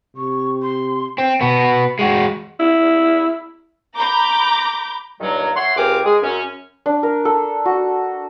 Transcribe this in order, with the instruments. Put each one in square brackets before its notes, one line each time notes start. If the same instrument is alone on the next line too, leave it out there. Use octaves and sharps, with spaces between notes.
[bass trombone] C3 [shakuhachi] C#6
[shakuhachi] C6
[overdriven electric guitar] C4
B2 B3
G#3 F#4
[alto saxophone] E4
[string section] A#5 B5 D6 G6
[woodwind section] G2 A#2 D#3 F#3
C#5 E5 F#5 C6
C#2 C4 G4 A#4 G#5 D6
G#3 G#4
F#2 C#4
[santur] D4
A#4
A4
F#4